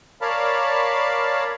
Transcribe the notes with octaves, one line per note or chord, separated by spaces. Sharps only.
A#4 C#5 D5 F5 A5 B5